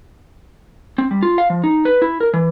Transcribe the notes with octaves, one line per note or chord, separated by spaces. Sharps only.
C4
G3
F4
F5
F3
D#4
B4
E4
A#4
E3